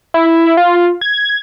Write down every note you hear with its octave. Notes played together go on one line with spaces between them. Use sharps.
E4
F4
G#6